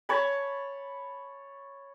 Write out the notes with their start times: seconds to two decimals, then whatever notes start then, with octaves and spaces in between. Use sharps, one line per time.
0.09 C#5 A5 B5